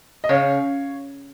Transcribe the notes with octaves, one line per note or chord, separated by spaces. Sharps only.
D#5
C#3 C#5 F5